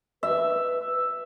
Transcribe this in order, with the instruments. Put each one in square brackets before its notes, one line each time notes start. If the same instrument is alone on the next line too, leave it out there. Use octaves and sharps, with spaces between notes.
[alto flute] B4 [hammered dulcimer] E5